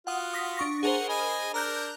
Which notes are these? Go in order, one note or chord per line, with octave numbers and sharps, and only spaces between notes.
F4 F#4 F#5 D#6
D#6 A#6 B6
D4 C#6 A#6
G#4 A#4 C5 F#5
D#5 G#5 B5
D4 A#4 A#5 F#6 G6